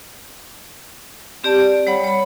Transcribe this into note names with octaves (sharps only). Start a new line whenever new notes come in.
C4 G4 D5 A5
D5
G3 C#5 F#5 B5
C#5 B5